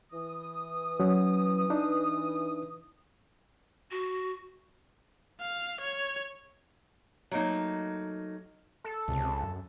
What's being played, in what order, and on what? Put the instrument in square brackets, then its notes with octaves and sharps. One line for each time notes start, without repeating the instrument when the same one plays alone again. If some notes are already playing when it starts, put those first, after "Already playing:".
[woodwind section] E3 D#6
[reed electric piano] F#3 C#4
D4 D#4
[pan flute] F#4
[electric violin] F5
C#5
[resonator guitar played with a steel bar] F#3 A3 A#3 D#4
[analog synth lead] A4
[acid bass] C#2 [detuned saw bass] C3
[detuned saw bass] F#2